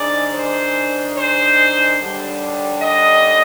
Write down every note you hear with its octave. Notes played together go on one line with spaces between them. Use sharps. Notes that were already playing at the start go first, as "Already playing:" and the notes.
Already playing: G#2 D#3 G#3 D4 D5
C5
C5
D#2 D3 G3 D4
D#5